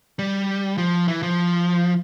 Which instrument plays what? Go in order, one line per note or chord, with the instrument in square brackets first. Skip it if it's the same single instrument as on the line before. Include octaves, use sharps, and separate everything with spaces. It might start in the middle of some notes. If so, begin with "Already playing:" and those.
[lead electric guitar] G3
F3
E3
F3